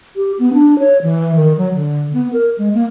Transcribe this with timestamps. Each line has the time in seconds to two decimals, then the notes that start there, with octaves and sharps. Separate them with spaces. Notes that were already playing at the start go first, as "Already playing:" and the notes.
0.16 G4
0.39 B3
0.54 D4
0.79 C#5
1.02 E3
1.36 D#3
1.57 F#3
1.74 D3
2.13 B3
2.33 A#4
2.58 G#3
2.74 A#3